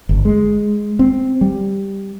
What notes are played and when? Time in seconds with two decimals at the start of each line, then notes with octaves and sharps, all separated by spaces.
0.09 G1
0.25 G#3
0.99 C4
1.41 G3